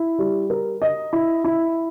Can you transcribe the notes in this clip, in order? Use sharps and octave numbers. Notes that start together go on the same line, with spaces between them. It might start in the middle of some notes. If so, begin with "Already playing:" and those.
Already playing: E4
G3
A#4
D#5
E4
E4